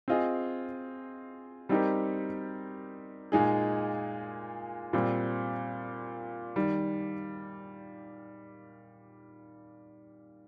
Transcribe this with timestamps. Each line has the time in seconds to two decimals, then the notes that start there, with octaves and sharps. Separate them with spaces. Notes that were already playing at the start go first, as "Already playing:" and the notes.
0.08 C4 F4 G#4 D#5
1.69 G3 C4 D#4 G4 A#4
3.32 A#2 G#3 D#4 G#4
4.93 A#2 G3 C4
6.56 D#3 G3